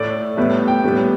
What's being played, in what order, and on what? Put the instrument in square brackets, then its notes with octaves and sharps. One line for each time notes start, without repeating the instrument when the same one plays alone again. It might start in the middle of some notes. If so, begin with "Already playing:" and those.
Already playing: [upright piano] A2 A3 D5
A2 G3 B3 E5
G5
A2 G3 B3